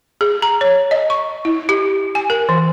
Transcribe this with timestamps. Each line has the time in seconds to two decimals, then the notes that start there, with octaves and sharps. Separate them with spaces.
0.21 G#4
0.42 A#5
0.61 C#5
0.91 D#5
1.10 C#6
1.45 E4
1.69 G4
2.15 G#5
2.30 A#4
2.49 E3